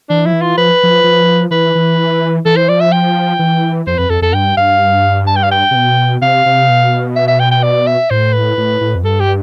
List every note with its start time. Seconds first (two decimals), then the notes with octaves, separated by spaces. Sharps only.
0.10 E3 D4
0.26 F3 E4
0.33 E3
0.42 F4
0.57 F3 B4
0.83 F3
1.04 F3
1.51 E3 B4
1.75 E3
2.45 E3 A4
2.57 C5
2.69 F3 D5
2.81 E5
2.92 G5
3.39 E3
3.87 F2 C5
3.98 F2 B4
4.10 F2 A4
4.22 F2 A4
4.33 G2 G5
4.57 G2 F5
5.27 A5
5.36 G5
5.43 F5
5.51 G5
5.71 C3
5.75 B2
6.22 C3 F5
6.46 C3
6.70 B2
7.16 E5
7.28 E5
7.39 G5
7.51 G5
7.63 D5
7.87 E5
8.10 A2 C5
8.33 B4
8.58 A2
8.81 A2
8.95 F2
9.04 G2 A4
9.20 G4